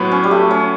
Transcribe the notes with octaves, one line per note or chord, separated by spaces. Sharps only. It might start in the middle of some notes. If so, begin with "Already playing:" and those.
Already playing: A2 F#3 B3 B4 C#5
C#4
G3
A3
C#4